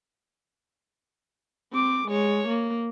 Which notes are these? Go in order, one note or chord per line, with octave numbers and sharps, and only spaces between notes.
C4 D6
G#3 C#5
A#3